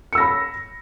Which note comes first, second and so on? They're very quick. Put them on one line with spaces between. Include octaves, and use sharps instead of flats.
C#7 E6 A#6 B5